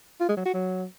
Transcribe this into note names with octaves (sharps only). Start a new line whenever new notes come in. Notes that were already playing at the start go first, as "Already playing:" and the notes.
F4
G#3
F#3
F#4
F#3